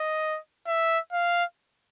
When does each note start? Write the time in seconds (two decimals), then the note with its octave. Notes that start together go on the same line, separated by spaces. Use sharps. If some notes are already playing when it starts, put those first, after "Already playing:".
Already playing: D#5
0.67 E5
1.12 F5